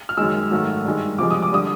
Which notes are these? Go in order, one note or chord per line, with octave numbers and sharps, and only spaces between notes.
F6
F#2 D#3 G#3 E6
G#2 D#3 F#3 A3
G2 D#3 G#3
C#2 C3 F3 G#3 D6
D#6
D6
D3 G3 D#6